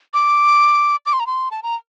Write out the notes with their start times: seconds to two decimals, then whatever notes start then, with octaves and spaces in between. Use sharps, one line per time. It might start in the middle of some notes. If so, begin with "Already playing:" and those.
0.14 D6
1.06 D6
1.13 C6
1.20 A#5
1.27 C6
1.51 A5
1.63 A#5